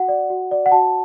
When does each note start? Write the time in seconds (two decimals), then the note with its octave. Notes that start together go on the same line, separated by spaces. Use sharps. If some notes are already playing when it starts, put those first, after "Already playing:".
Already playing: F#4 F#5
0.08 D5
0.30 F#4
0.51 D5
0.66 F#5
0.71 F#4 A5